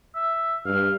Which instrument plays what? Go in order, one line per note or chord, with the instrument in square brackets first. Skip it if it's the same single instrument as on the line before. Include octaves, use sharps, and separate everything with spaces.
[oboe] E5
[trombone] G2 [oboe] F5